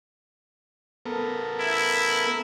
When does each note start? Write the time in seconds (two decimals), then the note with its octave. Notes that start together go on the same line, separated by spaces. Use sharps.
1.06 B3 A4 A#4
1.60 E4